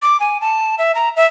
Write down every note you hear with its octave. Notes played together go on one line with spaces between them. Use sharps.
D6
G#5
A5
E5
A#5
E5